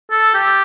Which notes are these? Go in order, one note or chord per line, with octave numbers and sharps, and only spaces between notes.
A4
G4